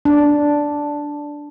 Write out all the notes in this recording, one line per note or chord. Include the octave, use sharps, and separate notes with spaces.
D4